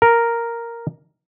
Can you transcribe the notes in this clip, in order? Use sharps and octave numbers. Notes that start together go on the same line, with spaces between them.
A#4